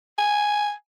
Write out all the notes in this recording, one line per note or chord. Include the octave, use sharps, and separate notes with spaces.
G#5